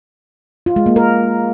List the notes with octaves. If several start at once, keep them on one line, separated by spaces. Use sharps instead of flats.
F4
G#3
A#3
A#4